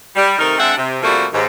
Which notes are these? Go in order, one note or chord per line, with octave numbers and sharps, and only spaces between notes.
G3
C3 D#3 A3 D#4 A#4
G#3 C4 D4 E5 F#5
C3
C3 F3 G3 A3 A#3 F#4
D#2 G#2